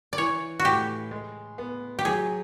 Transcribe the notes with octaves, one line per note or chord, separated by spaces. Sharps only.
D5
E3 C#5
F#4
A2 G4
G#3
B3
G4
F#3 G#4